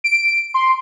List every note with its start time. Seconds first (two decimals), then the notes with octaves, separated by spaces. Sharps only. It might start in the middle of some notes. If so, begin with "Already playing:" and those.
0.04 D7
0.54 C6